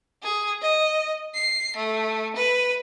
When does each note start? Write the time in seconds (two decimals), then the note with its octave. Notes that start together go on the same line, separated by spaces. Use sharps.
0.23 G#4
0.62 D#5
1.34 C7
1.76 A3
2.36 B4